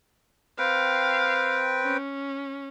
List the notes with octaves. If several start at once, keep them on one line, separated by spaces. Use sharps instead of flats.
C4 B4 F5 G5
C#4